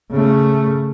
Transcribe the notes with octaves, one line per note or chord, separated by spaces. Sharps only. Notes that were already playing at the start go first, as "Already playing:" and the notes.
C#3 A3